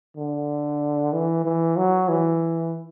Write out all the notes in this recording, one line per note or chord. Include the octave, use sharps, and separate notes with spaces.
D3
E3
E3
F#3
E3